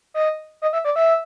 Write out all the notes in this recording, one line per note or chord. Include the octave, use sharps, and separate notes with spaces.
D#5
D#5
E5
D5
E5